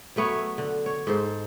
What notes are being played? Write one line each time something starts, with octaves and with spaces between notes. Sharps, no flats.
F#3 A3 B3 C#5
E5
D3
C#5
G#2 A4 C5